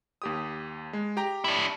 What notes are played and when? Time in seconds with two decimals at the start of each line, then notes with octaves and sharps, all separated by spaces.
0.22 D#2 G4 D#6
0.93 G#3
1.17 G4 G5 A#5
1.44 D4 E4